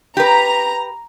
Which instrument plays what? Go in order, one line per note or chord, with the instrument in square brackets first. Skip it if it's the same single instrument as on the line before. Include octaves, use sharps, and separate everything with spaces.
[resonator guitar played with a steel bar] G4 B4 [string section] A#5